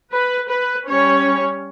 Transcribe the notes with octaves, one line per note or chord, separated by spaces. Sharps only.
B4
B4
G3 C#4 C#5